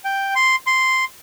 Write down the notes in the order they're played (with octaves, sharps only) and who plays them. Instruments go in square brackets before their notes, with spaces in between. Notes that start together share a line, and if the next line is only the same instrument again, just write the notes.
[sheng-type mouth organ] G5
C6
C6